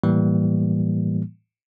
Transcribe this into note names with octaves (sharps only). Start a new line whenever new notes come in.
A2 E3 G3 A#3